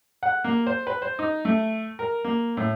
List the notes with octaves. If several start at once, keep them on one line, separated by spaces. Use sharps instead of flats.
F#5
A#3
C5
B4
C5
D#4
A3
A#4
A#3
A2